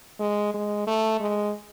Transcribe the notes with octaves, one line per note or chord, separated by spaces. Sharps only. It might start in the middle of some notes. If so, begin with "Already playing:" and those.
G#3
G#3
A3
G#3